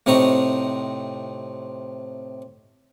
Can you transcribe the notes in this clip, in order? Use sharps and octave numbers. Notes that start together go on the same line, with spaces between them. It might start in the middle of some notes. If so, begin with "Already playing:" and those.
A2 C3 C4 D#4 A#5 C#6